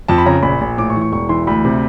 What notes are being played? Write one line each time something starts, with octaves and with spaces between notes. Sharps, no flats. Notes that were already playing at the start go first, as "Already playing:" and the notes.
F2 A5
B5
C#3 A#5
A#1 B5
A#1
A2 D6
C#6
E3
C#6
E1 C#6
E3 C6
D2 B5
C3